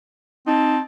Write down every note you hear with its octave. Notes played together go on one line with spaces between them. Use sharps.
C4 D#4 A5